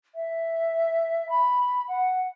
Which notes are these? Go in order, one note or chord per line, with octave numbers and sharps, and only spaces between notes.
E5
B5
F#5